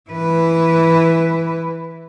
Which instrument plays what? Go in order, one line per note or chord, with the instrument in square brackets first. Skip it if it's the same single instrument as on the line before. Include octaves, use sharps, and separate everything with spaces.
[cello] E3 B4